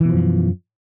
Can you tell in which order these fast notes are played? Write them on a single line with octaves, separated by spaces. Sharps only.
E3 B2 F3 F#2